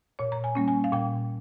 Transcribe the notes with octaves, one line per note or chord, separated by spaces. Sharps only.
A#2 C#5
A#5
G#5
G3 A#3 C#4
G#5
F5
A#2 G5